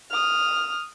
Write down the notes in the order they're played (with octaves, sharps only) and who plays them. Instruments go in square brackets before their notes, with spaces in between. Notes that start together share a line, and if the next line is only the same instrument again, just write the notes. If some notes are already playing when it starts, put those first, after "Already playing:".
[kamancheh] D#6 F6